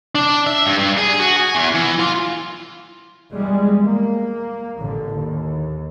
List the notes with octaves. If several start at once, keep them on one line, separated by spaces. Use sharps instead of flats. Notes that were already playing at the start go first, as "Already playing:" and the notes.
D4
E5
G2
G2
G#4
F#4
G#5
E2
E3
F4
E2 G3 G#3
A#3
A1 D3
D#2